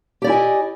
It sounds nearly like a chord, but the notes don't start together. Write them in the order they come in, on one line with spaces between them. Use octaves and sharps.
G4 D5 E4 G#5 D#5